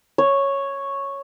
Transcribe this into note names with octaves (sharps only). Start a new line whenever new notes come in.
C#5